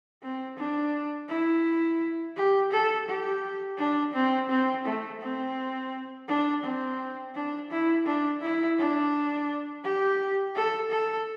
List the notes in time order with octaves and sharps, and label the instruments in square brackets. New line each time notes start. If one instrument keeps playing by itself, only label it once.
[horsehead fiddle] C4
D4
E4
G4
A4
G4
D4
C4
C4
A3
C4
D4
C4
D4
E4
D4
E4
D4
G4
A4
A4